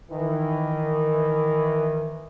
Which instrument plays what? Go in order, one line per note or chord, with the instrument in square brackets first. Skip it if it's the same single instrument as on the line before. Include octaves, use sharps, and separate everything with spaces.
[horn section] D#3 E3